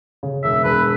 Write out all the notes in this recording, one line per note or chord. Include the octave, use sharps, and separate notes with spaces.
C#3
E1 E5
E1 B4